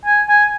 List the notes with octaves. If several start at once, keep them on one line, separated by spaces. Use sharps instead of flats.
G#5
G#5